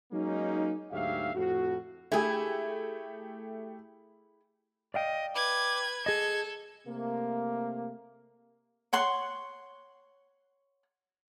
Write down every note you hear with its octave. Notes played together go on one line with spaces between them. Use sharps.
F#3 G#3 A#3 C#4 D#4
D2 G#2 F#3 G4 E5 F5
F2 A2 F#4
A3 E4 G4 G#4
D5 D#5 F5 G5
B4 D6 G#6
G#4 A4 D#5 G#6
C3 A3 A#3
C#5 F#5 C6 C#6